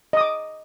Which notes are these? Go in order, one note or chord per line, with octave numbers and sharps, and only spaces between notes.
D#5 D6 D#6